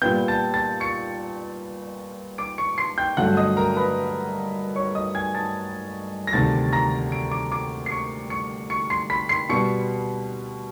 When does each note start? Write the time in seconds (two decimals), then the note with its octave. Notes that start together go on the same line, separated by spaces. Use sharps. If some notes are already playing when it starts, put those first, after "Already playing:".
0.02 A#2 G3 B3 G5 G6
0.28 A5 A6
0.54 A5 A6
0.80 C#6 C#7
2.38 D6 D7
2.58 C#6 C#7
2.78 C6 C7
2.98 G5 G6
3.17 G2 D3 F#3 A3 F#5 F#6
3.37 D#5 D#6
3.57 A#4 A#5
3.76 B4 B5
4.76 C#5 C#6
4.95 D#5 D#6
5.15 G#5 G#6
5.35 A5 A6
6.27 A#6
6.33 D2 C3 D#3 A5 A6
6.73 A#5 A#6
7.12 D7
7.31 D6 D7
7.52 D6 D7
7.86 C7
7.91 C#6 C#7
8.30 C#6 C#7
8.70 C#6 C#7
8.90 C6 C7
9.10 B5 B6
9.29 C6 C7
9.49 B2 G3 B3 C#6 C#7